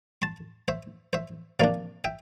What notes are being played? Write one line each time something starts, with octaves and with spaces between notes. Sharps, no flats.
A5 C6
C5 E5
C5 E5
C3 F3 A#3 D4 D5 F5
E5 G5